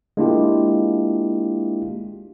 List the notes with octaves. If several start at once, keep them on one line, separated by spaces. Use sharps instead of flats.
G#3 A#3 D4 E4 F4 G4